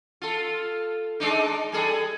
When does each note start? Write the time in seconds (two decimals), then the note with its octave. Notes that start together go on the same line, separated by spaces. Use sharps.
0.22 F4 A4
1.20 G#3 D4 D#4
1.72 G3 G#4 A4